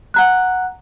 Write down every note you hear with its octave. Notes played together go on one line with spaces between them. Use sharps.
F#5 A#5 F#6